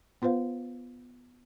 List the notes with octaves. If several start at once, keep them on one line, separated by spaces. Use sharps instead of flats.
B3 F4 B4 C5 F5